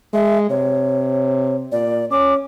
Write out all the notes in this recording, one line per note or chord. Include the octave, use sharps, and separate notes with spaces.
G#3 E5
C3 C#5
A#2 D5
C#4 D6